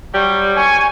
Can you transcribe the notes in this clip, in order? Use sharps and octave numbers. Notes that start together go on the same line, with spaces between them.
F#3 G3
G#5 C#6